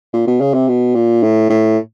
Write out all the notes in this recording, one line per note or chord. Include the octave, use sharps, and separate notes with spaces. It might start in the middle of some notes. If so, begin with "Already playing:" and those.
A#2
B2
C#3
C3
B2
A#2
A2
A2